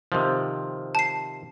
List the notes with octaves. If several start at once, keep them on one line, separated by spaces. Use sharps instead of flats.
C3 D#3 F3
A5 C7